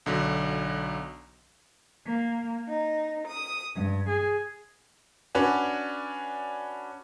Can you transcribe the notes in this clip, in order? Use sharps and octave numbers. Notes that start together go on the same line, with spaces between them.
B1 D3 F#3
A#3
D#4
D#6
G2
G#4
C#4 D4 F#4 B4 D5